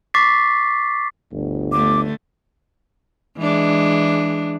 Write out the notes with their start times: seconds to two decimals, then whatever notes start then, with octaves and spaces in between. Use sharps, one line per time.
0.14 C#6 D6 A6 B6 C7
1.32 G1 D2
1.72 D3 A3 D6
3.38 E3 G#3 D4